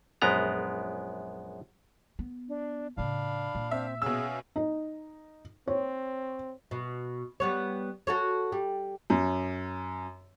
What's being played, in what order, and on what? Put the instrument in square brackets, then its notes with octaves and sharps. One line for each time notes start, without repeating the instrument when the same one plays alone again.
[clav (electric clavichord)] A#1 F#2 G#3 B3 A#5
[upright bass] B3
[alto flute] D4
[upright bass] A2 C#3 [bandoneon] D4 F5 [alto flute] B5
[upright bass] A#2
[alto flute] C4 [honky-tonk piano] E5
[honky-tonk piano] B2 E6 [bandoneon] C#4 E5 F5 [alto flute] G#4
[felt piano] D#4
[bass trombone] C4 [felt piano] C#5
[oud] B2
G3 B3 C#5
F#4 A4 C#5
G3
[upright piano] F#2